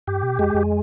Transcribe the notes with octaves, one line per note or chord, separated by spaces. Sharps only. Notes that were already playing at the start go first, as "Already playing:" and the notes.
G2 G4
B2
F2 G#3
F2